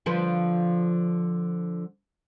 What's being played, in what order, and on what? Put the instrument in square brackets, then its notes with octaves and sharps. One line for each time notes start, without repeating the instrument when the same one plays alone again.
[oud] D3 F3 B4